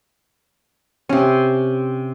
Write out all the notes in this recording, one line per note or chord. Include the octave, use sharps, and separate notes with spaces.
C3 C#4